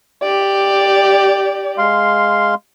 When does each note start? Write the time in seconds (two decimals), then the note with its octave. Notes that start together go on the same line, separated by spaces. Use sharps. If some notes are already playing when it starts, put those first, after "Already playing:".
0.23 G4 D5
1.78 G#3 F5 C6